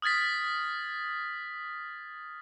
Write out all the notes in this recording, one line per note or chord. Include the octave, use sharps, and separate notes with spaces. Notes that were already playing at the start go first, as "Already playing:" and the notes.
D#6 F6 G#6 A6 B6